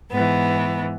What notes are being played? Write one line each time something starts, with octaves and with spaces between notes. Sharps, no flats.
G#2 E3 B3